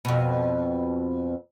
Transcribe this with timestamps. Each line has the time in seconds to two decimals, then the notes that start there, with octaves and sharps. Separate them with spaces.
0.05 F2 B2